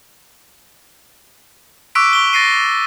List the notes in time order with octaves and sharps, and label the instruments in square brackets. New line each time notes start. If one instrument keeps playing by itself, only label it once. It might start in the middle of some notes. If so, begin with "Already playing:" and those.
[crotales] C#6 D6 E6 F#6 B6 D7
C#6 G7
A6 A#6 C7 D#7